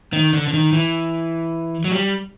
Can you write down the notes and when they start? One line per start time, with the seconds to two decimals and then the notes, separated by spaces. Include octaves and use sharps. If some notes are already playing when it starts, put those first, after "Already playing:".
0.13 D#3
0.33 D3
0.48 D3
0.53 D#3
0.73 E3
1.84 F#3
1.92 G3